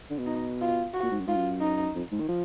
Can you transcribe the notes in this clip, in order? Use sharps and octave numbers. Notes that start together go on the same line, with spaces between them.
D3
B2
D#4
F4
F#4
A#2
G#2
F#2
G#2 F4
F#2
D#4
F2
G#2
D#3
F3